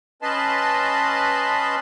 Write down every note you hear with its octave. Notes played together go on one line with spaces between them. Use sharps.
C#4 B4 D#5 A5 B5 C6